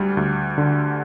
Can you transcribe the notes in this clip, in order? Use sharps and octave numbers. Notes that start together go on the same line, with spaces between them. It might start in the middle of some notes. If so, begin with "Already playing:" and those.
Already playing: D2 G3
D2
D3